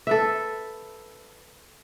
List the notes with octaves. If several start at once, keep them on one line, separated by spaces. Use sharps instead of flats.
A4 B4 E5